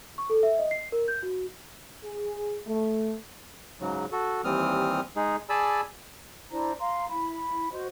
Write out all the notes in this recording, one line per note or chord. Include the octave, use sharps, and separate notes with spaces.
C#6
A4
E5
D#5
C7
A#4
G6
F#4
G#4
A3
G#2 C#3 F#3
F#4 A4
D#2 E3 G3 C4 D#6 F6
G#3 D#4 G#4
G#4 D5 G#5 A5 B5 E6
D4 E4 C5 A#5
F5 A#5 C6
E4 B5
F#4 C5 D#5